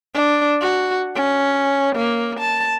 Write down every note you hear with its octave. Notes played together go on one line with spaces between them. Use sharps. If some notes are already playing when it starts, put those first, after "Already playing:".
D4
F#4
C#4
A#3
A5